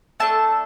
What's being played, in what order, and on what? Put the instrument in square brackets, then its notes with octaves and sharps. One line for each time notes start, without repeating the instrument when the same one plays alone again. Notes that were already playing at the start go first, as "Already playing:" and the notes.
[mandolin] A3 D4 A4 A5